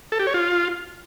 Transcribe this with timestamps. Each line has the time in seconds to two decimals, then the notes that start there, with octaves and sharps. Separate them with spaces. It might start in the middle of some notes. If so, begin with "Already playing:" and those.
0.12 A4
0.19 G4
0.27 C#5
0.34 F4